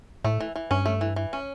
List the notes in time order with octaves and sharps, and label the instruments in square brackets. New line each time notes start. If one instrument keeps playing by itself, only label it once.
[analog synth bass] A2 [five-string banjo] A3
[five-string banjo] E3
E3
[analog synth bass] G2 [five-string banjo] C#4
[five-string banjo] A3
E3
E3
C#4